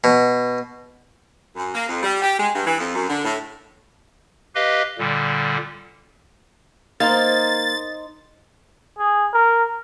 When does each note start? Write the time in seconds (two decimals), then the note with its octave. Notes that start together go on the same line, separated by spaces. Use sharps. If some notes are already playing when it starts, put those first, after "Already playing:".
0.04 B2
1.56 F#2
1.75 A#3
1.89 F2
2.03 G3
2.22 G4
2.39 G#3
2.54 G2
2.66 E3
2.78 F2
2.94 F#2
3.09 D3
3.25 A2
4.55 G4 B4 D#5 F5
4.99 A#2 D3 G3
7.00 A#3 D#4 C5 A6
8.98 G#4
9.34 A#4